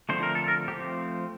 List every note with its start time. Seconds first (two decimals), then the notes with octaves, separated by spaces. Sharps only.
0.09 D3 F3 A3 C4 C5
0.23 A#4
0.35 A4
0.48 A#4
0.68 F3 A3 C4 G4